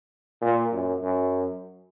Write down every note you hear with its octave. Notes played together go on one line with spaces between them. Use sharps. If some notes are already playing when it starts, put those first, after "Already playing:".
A#2
F#2
F#2